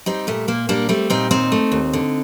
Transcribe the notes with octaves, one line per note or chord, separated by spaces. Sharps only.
G3 C4 D#4
A#2 A3
A#2 A#3
G3 A#3 D4
G3 A3 C4
A#2 C4 D#4
D#2 C4 D#4
A3
D#2
D3